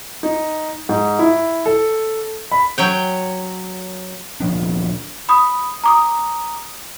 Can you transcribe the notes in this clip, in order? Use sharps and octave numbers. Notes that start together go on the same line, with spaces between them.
D#4
G#2
E4
A4
B5
F#3 C#5 G5
D2 A#2 F3 D4
B5 D#6
A#5 D6 D#6